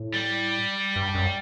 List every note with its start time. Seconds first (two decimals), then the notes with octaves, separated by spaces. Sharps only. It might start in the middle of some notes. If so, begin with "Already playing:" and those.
Already playing: A2
0.14 G3
0.96 G2
1.15 F#2